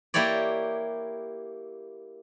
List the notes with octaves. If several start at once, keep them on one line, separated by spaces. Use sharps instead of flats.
A#3 E4 G4 C#5 D5